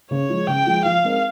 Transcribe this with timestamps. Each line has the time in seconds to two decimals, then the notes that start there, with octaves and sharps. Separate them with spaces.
0.11 C#3 C#5
0.29 F3 G#3
0.48 C#3 G5
0.66 F3 G#3
0.85 F3 F5
1.04 G#3 C4 D#4 A#4